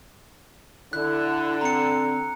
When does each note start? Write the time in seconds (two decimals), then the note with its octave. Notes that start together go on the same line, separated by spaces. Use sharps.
0.93 D3 E4 F#6
1.61 C4 A#5 C#7